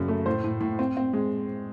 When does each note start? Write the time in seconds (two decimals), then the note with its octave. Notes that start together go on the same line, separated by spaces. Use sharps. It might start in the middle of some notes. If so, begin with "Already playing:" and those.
Already playing: F#2 C#3
0.08 A3
0.26 A2 C5
0.44 A2
0.61 A2
0.79 C4
0.97 C4
1.13 G#3